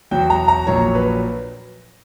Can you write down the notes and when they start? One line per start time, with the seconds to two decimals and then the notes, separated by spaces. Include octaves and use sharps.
0.11 E2 B2 F#3 G5
0.30 A#5
0.48 A#5
0.67 A#1 A#2 F#3 C#5
0.95 B4